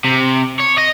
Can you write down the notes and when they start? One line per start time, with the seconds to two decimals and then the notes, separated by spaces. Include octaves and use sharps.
0.04 C3
0.59 C#5
0.77 D#5